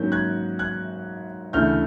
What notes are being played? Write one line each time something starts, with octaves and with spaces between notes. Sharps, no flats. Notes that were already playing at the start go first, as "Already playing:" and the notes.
Already playing: G#2 D#3 F#3 A#3 C#4 G6
F#6 G#6
F#6 G#6
D2 C#3 E3 A3 F6 G6